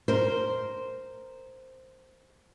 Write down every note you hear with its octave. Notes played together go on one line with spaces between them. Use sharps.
A#4 C5